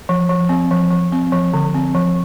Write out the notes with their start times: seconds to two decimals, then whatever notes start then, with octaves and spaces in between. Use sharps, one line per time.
0.09 F3
0.29 F3
0.49 C4
0.71 F3
0.91 F3
1.12 C4
1.32 F3
1.53 D3
1.74 C4
1.95 F3